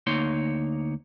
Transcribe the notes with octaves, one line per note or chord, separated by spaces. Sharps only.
D2 A#3 D#4 C#5 C6